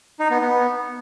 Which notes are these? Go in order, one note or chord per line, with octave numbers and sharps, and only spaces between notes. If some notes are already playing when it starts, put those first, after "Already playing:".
D#4
B3
B3